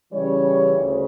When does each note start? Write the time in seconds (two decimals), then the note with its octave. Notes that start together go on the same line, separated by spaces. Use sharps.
0.13 C#3 E3 G3 C#4 C#5
0.77 D2 C#3